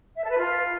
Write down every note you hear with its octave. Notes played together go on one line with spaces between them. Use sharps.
E5
A4
B4
F4